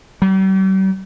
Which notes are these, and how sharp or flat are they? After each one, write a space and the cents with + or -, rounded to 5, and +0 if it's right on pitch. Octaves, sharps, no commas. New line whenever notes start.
G3 -45